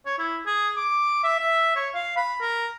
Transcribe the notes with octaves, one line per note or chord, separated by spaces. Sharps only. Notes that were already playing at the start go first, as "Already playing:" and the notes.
C#5
E4
G#4
D6
E5
E5
C#5
F5
B5
A#4